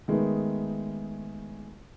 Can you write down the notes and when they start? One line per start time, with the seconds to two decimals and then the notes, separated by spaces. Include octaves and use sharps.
0.08 D#3 G#3 A3 B3 D#4